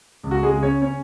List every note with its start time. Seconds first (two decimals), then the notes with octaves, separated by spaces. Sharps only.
0.23 C#2
0.31 F#4
0.43 G#3 G#4
0.53 C#3
0.63 C#4 C#5
0.82 C#4 C#5